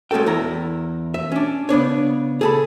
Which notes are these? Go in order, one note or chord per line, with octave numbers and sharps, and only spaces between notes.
G#3 C#4 F#4 A4 G5
E2 E4 A#5
E5
C#4 D4
C#3 B3 D4 C#5
G#4 A4 B5